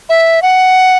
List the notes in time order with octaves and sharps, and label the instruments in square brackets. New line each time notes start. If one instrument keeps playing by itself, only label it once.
[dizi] E5
F#5